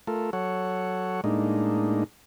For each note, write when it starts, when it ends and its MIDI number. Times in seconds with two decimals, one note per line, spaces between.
0.07 0.30 57
0.07 0.30 65
0.07 0.30 69
0.07 0.30 70
0.33 1.21 54
0.33 1.21 69
0.33 1.21 73
0.33 1.21 78
1.24 2.04 45
1.24 2.04 56
1.24 2.04 58
1.24 2.04 62
1.24 2.04 63